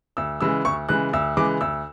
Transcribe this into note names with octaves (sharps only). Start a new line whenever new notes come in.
D2 E6
C#3 E3 G#3 E6
D2 C#6
C#3 E3 G#3 F#6
D2 E6
C#3 E3 G#3 D6
D2 E6